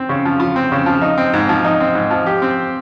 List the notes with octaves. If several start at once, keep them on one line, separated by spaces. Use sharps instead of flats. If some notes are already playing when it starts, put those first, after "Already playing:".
Already playing: C4
C#3
F3
F4
C4
C#3
F3
D#4
C4
G#2
F3
D#4
C4
G#2
F3
G4
C4